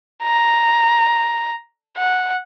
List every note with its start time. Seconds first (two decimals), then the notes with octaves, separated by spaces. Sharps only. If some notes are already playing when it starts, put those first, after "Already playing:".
0.23 A#5
1.97 F#5